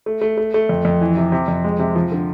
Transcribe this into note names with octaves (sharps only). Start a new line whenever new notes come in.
A3
A3
A3
A3
F2
F2
E3
C3
C3
F2
G#3
C3
F3
D3